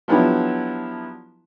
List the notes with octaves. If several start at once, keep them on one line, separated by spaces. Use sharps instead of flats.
F3 F#3 B3 D4 E4 G4